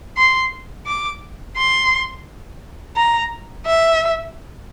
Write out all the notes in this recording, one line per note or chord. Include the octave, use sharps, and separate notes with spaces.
C6
D6
C6
A#5
E5